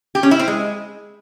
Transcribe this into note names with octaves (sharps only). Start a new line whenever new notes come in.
G4
C#4
E4
C4
G#3